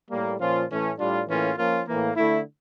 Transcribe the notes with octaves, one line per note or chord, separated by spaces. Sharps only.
A2 G3 A#3
A#2 F3 C#4 F4
A2 E3 A3 C#4
A2 G3 D4 F4
A2 E3 A#3 C#4 F4
F3 A#3 C#4 F4
A2 E3 A#3
D3 A3 E4